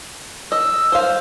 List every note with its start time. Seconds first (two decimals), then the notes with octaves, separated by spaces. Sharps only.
0.52 D#5 E6
0.92 C5 F5